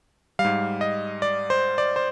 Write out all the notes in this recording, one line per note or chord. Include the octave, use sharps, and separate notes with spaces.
G3 F5
G#2
D#5
D5
C5
D5
C5